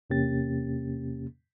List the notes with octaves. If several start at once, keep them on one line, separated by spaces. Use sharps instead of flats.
E2 C3 A#3 C#4 G4 A6